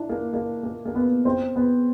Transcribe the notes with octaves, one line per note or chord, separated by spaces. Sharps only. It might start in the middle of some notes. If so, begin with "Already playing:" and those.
Already playing: D4 E4
A#3
A#3
A#3
A#3
B3
C4
B3